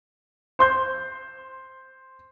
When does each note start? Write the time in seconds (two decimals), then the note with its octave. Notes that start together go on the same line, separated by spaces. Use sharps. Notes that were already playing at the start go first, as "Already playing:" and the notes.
0.59 C5 C6 G6